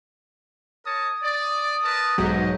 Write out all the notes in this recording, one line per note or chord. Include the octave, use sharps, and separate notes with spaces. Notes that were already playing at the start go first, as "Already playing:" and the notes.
A#4 C#5 A5 D#6
D5
A#4 B4 A5
B1 G#2 F#3 G4 D#5